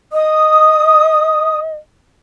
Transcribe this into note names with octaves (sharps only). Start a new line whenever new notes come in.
D#5 D#6